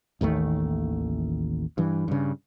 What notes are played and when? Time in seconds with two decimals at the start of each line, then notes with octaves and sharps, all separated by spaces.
0.21 A1 D#2 D#3 A3
1.78 G2 E3
2.08 G2 C#3